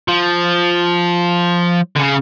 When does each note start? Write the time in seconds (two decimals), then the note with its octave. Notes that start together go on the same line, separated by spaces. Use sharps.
0.08 F3
1.96 D3
1.99 C#3